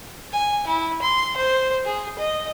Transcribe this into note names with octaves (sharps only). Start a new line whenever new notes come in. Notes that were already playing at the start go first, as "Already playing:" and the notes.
G#5
E4
C6
C5
G#4
D#5